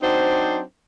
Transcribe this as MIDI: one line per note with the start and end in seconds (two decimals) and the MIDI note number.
0.02 0.60 54
0.02 0.60 60
0.02 0.60 62
0.02 0.60 63
0.02 0.60 72